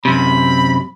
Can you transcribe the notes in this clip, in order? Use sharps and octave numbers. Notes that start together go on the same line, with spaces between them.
F#2 C3 B5